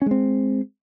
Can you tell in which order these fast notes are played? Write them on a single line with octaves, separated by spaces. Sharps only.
C#4 G#3 C4